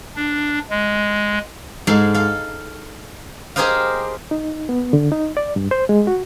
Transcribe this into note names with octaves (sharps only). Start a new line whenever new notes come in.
D4
G#3
G#2 G#3 A4 F5
A4 F5
G4 G#4 A#4 C5 D#5 F5
D#4
B3
D3
D#4
D5
G2
C5
G#3
F#4